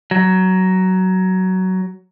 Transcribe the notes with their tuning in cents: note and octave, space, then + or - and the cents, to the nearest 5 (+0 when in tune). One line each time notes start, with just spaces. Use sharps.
F#3 +15